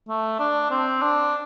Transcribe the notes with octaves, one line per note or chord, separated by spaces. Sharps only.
A3
D4
C4
D4